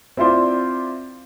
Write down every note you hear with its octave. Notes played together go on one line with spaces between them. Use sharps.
C4 E4 F4 C5 D5